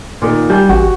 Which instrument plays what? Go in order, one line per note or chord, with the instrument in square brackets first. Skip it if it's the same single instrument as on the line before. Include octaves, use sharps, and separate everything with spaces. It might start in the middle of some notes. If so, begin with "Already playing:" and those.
[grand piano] A#2 D#3
[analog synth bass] G3 [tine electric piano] G4 G#5 [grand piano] G6
[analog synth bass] A1 [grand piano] F#4